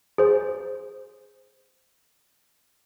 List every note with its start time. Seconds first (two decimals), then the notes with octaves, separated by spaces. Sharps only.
0.18 G#4 C5